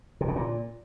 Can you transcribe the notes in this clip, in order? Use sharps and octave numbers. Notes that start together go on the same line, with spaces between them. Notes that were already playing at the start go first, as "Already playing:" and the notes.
C3
C#3
A#2